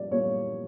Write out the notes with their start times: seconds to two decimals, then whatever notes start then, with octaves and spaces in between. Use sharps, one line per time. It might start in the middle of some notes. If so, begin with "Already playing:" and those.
Already playing: A#2 G3 A#3 D5
0.11 A#2 G3 A#3 C#5